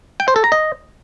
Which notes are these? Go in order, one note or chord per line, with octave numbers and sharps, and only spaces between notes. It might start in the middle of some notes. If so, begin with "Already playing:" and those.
G5
C5
A4
A#5
D#5